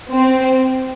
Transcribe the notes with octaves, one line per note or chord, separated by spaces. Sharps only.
C4